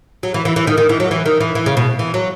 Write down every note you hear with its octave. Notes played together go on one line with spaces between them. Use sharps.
F#3
E3
E3
E3
D#3
D#3
E3
F#3
E3
D#3
E3
E3
C#3
B2
E3
F#3